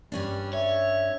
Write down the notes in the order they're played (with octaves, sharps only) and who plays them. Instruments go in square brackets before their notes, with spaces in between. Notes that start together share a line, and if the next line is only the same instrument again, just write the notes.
[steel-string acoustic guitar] G2 C#4 D4 [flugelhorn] G3
[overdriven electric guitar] C#5 [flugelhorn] E5